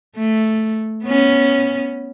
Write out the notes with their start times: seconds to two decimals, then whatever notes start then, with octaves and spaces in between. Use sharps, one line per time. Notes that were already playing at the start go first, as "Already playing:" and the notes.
0.16 A3
1.04 B3 C#4